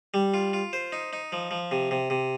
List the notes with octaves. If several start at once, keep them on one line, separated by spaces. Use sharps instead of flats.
G3
F4
F4
C5
D#4
D#4
F3
F3
C3
C3
C3